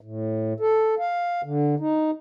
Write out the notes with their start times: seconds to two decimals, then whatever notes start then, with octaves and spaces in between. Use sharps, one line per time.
0.01 A2
0.60 A4
0.99 F5
1.44 D3
1.80 D#4